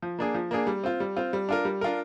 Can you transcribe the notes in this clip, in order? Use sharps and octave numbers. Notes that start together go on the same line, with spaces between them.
F3
A#3 D4 G#4
F3
A#3 D4 G#4
G3
C4 F4
G3
C4 F4
G3
D4 F4 A#4
G3
D4 F4 A#4